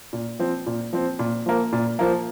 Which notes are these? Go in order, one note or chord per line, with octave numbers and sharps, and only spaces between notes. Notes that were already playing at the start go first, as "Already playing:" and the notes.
A#2
F3 C4
A#2
F3 C4
A#2
F3 A#3
A#2
F3 A#3